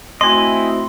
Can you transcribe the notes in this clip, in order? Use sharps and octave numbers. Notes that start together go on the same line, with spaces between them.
A3 C4 E4 F#4 D#5 G#5 C6